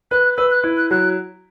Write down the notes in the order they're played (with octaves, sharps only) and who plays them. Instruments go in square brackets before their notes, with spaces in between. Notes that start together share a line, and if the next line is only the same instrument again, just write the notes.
[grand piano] B4 [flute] F#6
[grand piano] B4 [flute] E6
[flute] F#6
[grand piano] E4
[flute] F#6
[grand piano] F#3 [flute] F#6